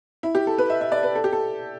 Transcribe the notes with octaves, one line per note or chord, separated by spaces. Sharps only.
E4
G4
A4
B4
E5
E5
D5
B4
A4
G4
A4